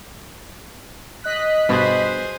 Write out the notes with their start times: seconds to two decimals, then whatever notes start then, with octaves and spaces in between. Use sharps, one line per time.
1.22 D#5 F#6 B6
1.69 G2 B2 G#4 C5